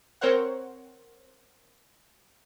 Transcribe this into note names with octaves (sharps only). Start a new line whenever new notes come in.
C4 A#4 C5 C#5 F#5